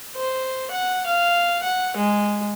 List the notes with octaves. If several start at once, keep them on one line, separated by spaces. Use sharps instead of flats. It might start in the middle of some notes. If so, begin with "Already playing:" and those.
C5
F#5
F5
F#5
G#3